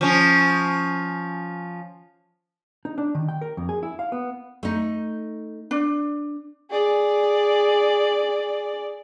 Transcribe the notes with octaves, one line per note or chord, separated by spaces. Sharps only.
F3 C#4
D#4
D4
D#3
G5
A#4
F2
G#4
E4
F5
B3
A3 D#4
D4
G#4 D5